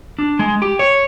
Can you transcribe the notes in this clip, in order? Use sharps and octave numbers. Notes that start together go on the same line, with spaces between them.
D4
G#3
G4
C#5